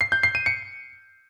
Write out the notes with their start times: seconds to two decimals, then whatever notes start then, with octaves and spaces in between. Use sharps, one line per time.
0.01 C7
0.12 G6
0.23 C7
0.35 D#7
0.46 C#7